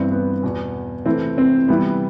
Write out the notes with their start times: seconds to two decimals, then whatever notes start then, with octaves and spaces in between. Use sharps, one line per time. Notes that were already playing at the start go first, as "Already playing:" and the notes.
Already playing: G2 E3 G3 B3 C4
0.12 B3
0.43 E2 B2 B3
1.06 C3 E3 A3 C4
1.38 C4
1.68 C3 E3 G3 B3